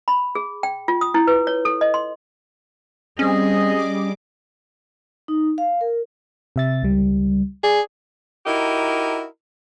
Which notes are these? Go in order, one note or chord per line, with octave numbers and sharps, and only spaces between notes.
B5
G#4
G5
F4
D#6
E4
B4
C#5
A4
D#5
C6
G3 C4 C#4 G#4 D#5
G3 D6
D#4
F5
A#4
C3 E5 A6
C#2 G3
G#4 D5
D#4 E4 F#4 G4 A#4 D#5